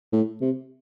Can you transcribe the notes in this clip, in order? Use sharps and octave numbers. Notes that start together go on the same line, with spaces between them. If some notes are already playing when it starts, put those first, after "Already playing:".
A2
C3